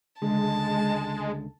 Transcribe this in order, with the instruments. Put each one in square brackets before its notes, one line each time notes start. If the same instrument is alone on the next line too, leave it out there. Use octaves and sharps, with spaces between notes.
[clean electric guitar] C#2 D3 [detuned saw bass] G#3 [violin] A5